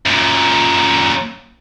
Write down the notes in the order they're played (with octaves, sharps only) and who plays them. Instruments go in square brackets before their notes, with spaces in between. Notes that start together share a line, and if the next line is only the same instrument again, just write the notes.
[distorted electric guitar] F#2 A#2